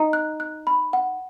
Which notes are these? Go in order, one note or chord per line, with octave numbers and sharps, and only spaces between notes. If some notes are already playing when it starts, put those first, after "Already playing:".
Already playing: D#4
F#6
F#6
B5
F#5